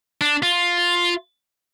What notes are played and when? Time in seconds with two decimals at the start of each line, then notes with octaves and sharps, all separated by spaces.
0.21 D4
0.43 F4